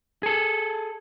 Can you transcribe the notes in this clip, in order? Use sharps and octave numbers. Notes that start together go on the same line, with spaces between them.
G#4 A4